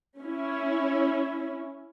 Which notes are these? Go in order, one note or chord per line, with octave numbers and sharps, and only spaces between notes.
C#4 E4